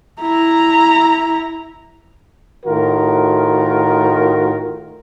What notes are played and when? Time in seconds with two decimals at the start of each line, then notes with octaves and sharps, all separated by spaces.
0.20 E4 A#5
2.66 A2 D#3 F4 F#4 A#4